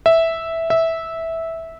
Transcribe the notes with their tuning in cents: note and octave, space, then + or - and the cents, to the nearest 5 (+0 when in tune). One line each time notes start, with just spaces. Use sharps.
E5 -5
E5 -10